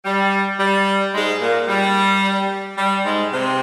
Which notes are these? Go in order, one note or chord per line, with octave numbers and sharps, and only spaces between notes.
G3
G3
G#2 G#3
A#2 A#3
G3
G3
G#2 G#3
C3 C4